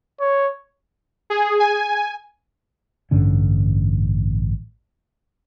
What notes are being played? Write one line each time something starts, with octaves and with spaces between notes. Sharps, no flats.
C#5
G#4
G#5
A1 G2 D3 C#4